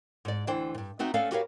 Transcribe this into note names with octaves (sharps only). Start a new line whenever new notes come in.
G#2 D5
D2 E3 D4 C5 G5
G2 A#2
B3 C4 D#4 F#4 E5
A3 B3 C#4 A4 D5 F5
F#4 G4 A#4 B4 C#5 F5